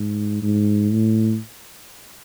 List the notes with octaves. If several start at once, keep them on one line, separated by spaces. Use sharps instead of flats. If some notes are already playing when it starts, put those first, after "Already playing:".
Already playing: G#2
G#2
A2